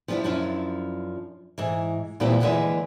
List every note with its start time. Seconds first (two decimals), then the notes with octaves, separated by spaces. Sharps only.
0.08 F3 G3 C#4 D4 E4
0.24 F#2 F3 C#4 D4 E4
1.58 G#2 E3
2.20 E2 A#2 G3 A#3 C4 E4
2.40 D#2 D3 E3 G#3 G#4 E5